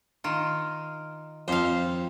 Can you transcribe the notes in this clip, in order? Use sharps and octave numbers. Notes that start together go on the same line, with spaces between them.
D#3 F4
F2 C5 F5